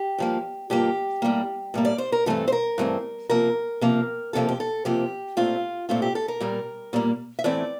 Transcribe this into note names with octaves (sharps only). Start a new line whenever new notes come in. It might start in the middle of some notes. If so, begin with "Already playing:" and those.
Already playing: G4
G2 F3 A#3
G2 F3 A#3 G4
A2 G3 A#3
A2 G3 A#3
D5
C5
A#4
G2 E3 A3 C4 A4
C5
A#4
G2 E3 A3 C4
C3 F3 A#3 A#4
C3 F3 A#3
F2 C3 F3 A#3 A4
G4
A4
F2 C3 F3 A#3 G4
A#2 A3 C4 F4
A#2 A3 C4 F4
G4
A4
A#4
A#2 G3 A#3
A#2 G3 A#3
E5
A2 E3 A3 C4 D5